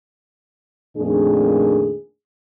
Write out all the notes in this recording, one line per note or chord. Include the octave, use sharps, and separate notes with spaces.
F2 A#2 D#3 A3 D4 G#4